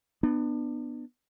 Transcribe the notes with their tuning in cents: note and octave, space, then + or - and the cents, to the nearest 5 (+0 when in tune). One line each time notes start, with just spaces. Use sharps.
B3 +0 D4 +35